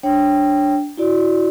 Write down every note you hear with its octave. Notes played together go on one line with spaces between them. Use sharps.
D4 C#5 G5
E4 F#4 D5